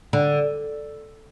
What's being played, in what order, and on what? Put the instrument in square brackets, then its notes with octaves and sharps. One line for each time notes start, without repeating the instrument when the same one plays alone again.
[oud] D3